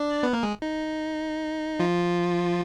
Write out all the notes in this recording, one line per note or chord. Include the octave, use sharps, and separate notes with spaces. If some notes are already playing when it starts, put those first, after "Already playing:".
Already playing: D4 D5
B3 B4
A#3 A#4
G#3 G#4
D#4
F3 F4